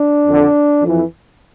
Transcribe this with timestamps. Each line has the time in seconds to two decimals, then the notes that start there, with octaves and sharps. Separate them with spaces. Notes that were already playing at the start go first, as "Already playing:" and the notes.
Already playing: D4
0.27 F2 D3
0.82 F2 E3